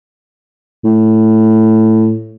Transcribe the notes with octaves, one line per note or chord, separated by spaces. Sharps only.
A2